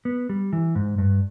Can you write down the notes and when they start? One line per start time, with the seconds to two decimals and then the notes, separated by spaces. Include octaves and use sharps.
0.05 B3
0.29 G3
0.53 E3
0.75 G#2
0.98 G2